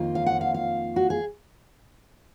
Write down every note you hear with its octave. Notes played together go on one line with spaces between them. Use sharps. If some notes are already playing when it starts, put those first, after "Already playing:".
Already playing: F2 D#3 A#3 F4
F5
F#5
F5
F5
F#4
G#4